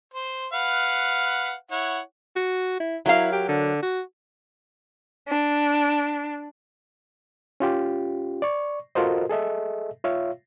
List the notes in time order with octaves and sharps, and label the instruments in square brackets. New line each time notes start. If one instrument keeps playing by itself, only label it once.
[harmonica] C5
B4 F5 F#5
E4 C#5 F#5
[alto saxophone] F#4
E4
[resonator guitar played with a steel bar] F#3 A#4 F5 [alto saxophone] E4
[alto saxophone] G4
D3
F#4
[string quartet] D4
[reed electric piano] C#4 F4 G4
D5 C#6
F4 F#4 A4 A#4 C5 D#5
G#4 A4 D#5 E5
F4 C#5 E5 F5